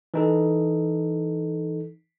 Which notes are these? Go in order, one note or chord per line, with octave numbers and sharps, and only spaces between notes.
E3 D#4 A4